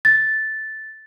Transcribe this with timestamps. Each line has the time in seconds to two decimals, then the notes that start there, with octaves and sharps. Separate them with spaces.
0.05 A6